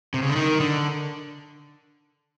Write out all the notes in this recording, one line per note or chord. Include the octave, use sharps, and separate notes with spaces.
C3
C#3
D3
D#3
D3